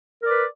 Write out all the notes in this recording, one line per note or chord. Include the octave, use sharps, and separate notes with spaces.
A#4 B4 D5